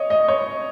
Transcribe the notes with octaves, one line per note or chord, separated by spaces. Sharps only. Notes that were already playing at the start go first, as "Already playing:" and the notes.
Already playing: C#5 D#5
D#5
C#5